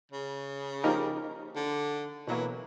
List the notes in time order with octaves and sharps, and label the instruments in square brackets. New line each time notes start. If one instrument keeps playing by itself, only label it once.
[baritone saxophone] C#3
[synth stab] F3 A#3 D#4 G4 A#4
[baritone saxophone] D3
[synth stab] B2 F#3 A#3 [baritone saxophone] E3